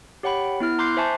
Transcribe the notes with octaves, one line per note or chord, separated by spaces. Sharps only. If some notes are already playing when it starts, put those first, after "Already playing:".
G4 C#5 F#5 G5 B5
B3 E4 F6
A#5 C6 D6 F#6 G6 C7
C5 E5 G#5 A5 C#6